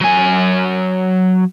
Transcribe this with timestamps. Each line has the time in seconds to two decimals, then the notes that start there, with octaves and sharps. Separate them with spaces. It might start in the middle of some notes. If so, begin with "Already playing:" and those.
0.01 F#3 G#5